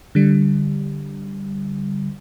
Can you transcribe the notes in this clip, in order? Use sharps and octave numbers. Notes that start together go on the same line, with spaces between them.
D3 G3